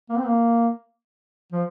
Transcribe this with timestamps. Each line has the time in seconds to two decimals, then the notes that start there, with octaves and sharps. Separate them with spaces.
0.09 A#3
0.17 C4
0.26 A#3
1.52 F3